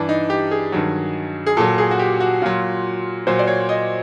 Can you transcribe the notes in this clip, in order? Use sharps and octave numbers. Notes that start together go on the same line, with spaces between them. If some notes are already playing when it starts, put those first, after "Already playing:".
Already playing: G2 E3 D4
D#4
G4
G#4
G2 D#3 F#3
G#4
A#2 F#3 A4
G#4
F#4
G4
F#4
A#2 F#3 F4
A#2 F#3 C5
D5
C#5
D#5